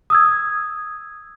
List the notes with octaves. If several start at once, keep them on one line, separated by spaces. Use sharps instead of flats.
D#6 E6 G#6